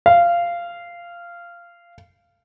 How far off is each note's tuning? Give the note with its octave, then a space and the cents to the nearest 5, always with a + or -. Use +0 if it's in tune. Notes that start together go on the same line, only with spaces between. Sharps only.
F5 -15